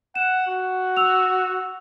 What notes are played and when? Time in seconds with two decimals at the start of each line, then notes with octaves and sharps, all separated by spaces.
0.15 F#5 E7
0.47 F#4
0.97 E6 F7